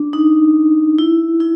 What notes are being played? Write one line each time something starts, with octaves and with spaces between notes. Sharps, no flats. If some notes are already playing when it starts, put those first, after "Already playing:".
Already playing: D4
D#4
E4
E4